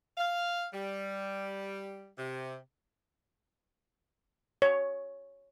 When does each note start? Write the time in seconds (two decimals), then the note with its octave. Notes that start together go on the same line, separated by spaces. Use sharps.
0.18 F5
0.74 G3
2.19 C3
4.62 C#5